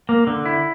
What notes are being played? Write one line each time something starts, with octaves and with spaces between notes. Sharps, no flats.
A#3
D3
E4